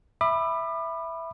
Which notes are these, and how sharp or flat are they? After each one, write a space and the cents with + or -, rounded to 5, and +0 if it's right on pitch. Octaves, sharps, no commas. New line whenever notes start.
E5 +0 B5 +0 D6 +40